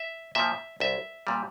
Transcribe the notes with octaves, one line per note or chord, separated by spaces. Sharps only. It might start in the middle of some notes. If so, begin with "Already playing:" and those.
Already playing: E5
A#2 F3 E5
C2 E5
A#2 G3